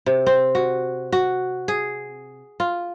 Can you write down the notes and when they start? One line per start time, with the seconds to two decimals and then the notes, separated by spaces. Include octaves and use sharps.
0.06 C3
0.26 C4
0.55 F#4
1.12 F#4
1.68 G#4
2.60 F4